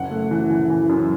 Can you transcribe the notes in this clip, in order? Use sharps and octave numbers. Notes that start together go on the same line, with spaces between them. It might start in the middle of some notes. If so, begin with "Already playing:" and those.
Already playing: F#1 F#5
A3
E3
E3
E3
F#2